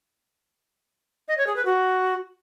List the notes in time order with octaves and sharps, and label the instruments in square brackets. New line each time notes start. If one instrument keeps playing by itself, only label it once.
[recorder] D#5
C#5
G#4
B4
F#4